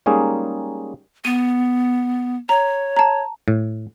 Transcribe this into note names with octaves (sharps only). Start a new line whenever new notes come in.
G3 G#3 A#3 C#4 D#4 G#4
B3 D#7
C#5 A#5
A5 A#5
A2